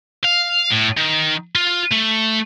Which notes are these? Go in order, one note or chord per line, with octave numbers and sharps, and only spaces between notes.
F5
A2
D#3
F4
A3